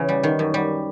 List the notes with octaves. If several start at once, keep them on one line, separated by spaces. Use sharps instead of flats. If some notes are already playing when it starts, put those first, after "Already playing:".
Already playing: C#3 E3
G3
D#3
F#2
G3